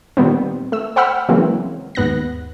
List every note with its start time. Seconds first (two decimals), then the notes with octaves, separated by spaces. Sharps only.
0.17 A#2 D#3 G3 B3 C4
0.72 A3 E6
0.96 C5 F#5 G5 B5 E6 F6
1.29 C#3 E3 F#3 G#3 A#3 C4
1.95 D#2 G#2 B3 F#6 A#6